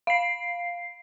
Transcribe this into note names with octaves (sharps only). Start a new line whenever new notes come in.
F5 C7